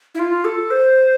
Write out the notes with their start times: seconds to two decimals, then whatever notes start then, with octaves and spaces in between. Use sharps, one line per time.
0.15 E4
0.19 F4
0.45 A4
0.71 C5